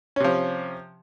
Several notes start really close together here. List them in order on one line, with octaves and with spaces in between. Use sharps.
C#4 C3 F3